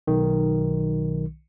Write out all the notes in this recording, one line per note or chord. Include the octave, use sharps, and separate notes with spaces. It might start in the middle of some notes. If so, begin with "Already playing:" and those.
B1 D#3